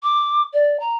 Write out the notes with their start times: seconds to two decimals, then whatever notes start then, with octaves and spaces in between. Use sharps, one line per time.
0.03 D6
0.53 D5
0.79 A#5